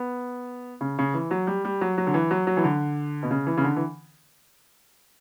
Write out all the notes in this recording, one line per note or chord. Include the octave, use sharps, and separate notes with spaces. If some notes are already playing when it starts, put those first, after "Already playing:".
Already playing: B3
C#3
C#3
E3
F#3
G3
G3
F#3
F#3
D3
E3
F#3
F#3
E3
D3
B2
C#3
E3
C#3
D3
E3